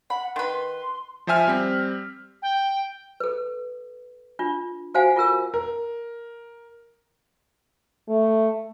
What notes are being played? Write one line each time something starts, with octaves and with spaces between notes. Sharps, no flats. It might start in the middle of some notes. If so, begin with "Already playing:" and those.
F#5 B5
D#3 B4 C6
F3 C5 E5 G#5 F6
G3 C4 B6
G5
A4 B4
D4 F4
F#4 C5 F5 F#5 G#5
F4 A4 A#4 E6
A#4
A3